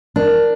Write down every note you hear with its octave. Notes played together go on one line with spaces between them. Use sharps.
D4 A#4